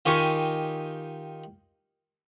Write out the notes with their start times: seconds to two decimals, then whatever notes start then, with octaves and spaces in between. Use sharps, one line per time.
0.06 D#3 F4 G4 G#5 C#6 D#6